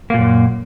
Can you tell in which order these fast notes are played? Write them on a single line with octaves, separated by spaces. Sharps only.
A#3 A#2 F#2